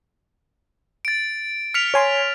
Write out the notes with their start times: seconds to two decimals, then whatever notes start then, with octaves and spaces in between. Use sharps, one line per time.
1.05 A6 D7
1.74 F6 B6 C#7 F7
1.94 C#5 G#5 C6